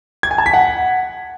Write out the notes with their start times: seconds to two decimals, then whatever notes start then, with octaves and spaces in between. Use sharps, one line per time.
0.23 G#6
0.31 G#5
0.38 A5
0.46 B6
0.53 F#5